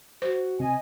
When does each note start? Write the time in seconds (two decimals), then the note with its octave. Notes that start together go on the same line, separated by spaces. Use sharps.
0.22 F#4 C5
0.59 C3 C4 D#5 G#5